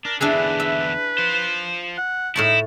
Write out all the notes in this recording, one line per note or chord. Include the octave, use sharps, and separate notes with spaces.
D4 A#4
E2 D3 D4 E4 G#4 B4
E5
F4 C5
F#5
A2 D#4 E4 C#5 A5